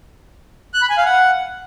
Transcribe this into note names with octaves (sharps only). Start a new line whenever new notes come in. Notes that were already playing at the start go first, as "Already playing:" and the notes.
F#6
B5
G#5
F5
F#5